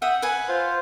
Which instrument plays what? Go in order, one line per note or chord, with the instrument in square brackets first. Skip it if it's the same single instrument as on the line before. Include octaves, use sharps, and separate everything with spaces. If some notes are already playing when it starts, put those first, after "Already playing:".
[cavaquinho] E5 G5 D#6 [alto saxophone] F#5
[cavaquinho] B4 G#5
[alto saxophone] F4 [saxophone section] C5